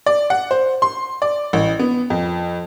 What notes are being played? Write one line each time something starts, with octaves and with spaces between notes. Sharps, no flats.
D5
F#5
C5
C6
D5
A1
B3
F2